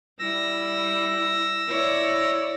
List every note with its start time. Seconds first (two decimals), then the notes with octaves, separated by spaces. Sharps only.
0.19 G3 E4 E6 A#6
1.67 E4 C#5 D5